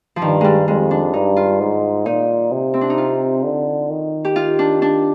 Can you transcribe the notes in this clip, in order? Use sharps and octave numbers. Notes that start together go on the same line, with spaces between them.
F3
G2 D#3
G3 G#3
F2 G#3
D4
G2 D#4
F4
G#2
A#2 D#4
C3
C4
D4
D#4
F4
D3
D#3
G4
F4
D4
D4